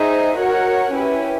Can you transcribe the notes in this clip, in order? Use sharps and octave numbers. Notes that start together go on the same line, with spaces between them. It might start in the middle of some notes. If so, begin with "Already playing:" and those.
Already playing: D#4 G#4 C5 E5
F#4 A#4 C#5 F#5
C#4 E4 G4 B4